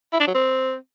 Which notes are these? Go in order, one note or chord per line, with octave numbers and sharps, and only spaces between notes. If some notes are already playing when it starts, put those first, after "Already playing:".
E4
D4
F#3
C4